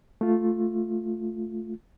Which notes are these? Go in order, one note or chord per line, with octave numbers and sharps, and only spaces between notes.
A3 F4